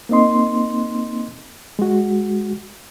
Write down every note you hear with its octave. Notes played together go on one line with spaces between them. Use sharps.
A#3 C4 D#4 D#5 C6
G#3 F#4